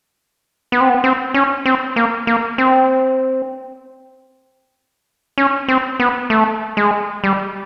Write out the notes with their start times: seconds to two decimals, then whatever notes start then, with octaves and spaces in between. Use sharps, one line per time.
0.72 B3
0.81 C4
0.89 B3
1.04 C4
1.34 C#4
1.66 C4
1.96 A#3
2.27 A#3
2.58 C4
5.38 C#4
5.68 C4
6.00 B3
6.30 A3
6.77 G#3
7.24 G3